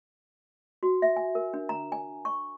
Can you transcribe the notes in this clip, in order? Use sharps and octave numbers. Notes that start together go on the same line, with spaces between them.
F#4
E5
G#5
A#4
D4
A#5
G#5
C#6